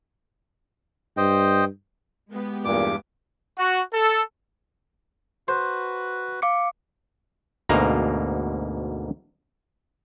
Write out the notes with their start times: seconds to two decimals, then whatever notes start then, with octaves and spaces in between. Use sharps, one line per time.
1.17 G2 C5 D#5 G5
2.30 G#3 B3 G4
2.65 E2 G2 A#2 D6
3.56 F#4
3.93 A4
5.48 F#4 B4 C5
6.42 F5 D6 C#7
7.69 D2 G#2 B2 A#3 A#5